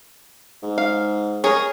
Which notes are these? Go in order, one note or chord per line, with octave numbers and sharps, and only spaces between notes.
G#2
F5
G#4 A#4 C#5